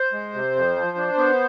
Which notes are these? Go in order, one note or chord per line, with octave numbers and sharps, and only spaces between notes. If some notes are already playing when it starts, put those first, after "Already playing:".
Already playing: C5
G#3
C3
F2
F3
D4
B3